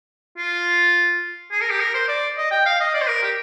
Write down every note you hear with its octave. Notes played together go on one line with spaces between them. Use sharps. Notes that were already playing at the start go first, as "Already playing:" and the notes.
F4
G#4
A#4
G4
A#4
C5
D5
D#5
G5
F5
D#5
D5
C5
A#4
G4